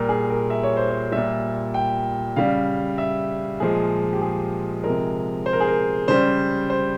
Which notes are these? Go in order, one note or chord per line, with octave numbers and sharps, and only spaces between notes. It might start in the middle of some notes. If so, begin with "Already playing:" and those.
Already playing: A#2 G3 A#4
G#4
A#4
E5
C#5
C5
C#5
A#2 G3 E5
G5
C#3 G3 F5
E5
A#2 F3 G#3 G#4
G4
G#4
C3 F3 G#3 A#4
C5
A#4
G#4
A#4
C#3 G3 C5
C5